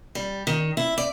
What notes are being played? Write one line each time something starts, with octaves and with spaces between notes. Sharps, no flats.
G3
D#3
E4
D5